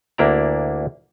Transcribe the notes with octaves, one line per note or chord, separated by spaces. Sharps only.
D2 A#3 D4 E4 D5 A#5